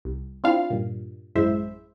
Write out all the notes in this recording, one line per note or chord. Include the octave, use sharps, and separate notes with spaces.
C2
C4 D4 E4 F4 F5
G2 A#2
A1 F#2 G#3 E4 C5 E5